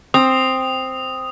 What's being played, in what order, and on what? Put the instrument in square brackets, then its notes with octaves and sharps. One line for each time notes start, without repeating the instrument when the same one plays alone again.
[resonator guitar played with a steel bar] C4 [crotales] D#6